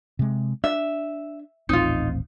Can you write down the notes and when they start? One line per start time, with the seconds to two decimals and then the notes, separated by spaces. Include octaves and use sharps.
0.19 C3 G#3
0.64 D4 E5
1.69 D#1 A1 C4 D#4 F4